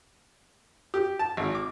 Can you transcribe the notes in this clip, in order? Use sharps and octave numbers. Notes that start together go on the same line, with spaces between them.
G4
A5
G#1
D6